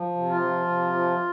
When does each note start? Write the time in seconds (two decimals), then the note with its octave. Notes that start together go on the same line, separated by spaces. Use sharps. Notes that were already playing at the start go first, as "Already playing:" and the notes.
Already playing: F3
0.15 C3
0.29 F4
0.42 F3
0.67 C3
0.93 F3